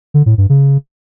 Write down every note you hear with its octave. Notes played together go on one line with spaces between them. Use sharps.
D3
A2
G2
C#3